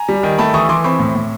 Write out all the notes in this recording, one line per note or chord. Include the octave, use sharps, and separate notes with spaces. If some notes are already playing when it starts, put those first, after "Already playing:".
Already playing: G#5 A#5
G3
D#3
A3 A5 B5
E3 C#6 D#6
E3 C6 D6
C4 B5 C#6
A2
A2